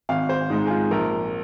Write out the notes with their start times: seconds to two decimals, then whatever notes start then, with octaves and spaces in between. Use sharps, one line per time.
0.09 G#1 F5
0.29 C5
0.50 G#2 G#3 D#4
0.67 G#4
0.70 F4
0.91 A#1 A#4